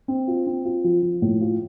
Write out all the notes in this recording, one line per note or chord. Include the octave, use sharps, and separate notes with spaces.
C4
F4
C4
F4
F3
F3
A2
F4